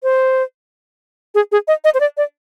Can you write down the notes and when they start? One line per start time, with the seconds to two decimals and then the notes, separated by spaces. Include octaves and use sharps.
0.03 C5
1.35 G#4
1.52 G#4
1.68 D#5
1.84 D#5
1.94 C5
2.00 D5
2.17 D5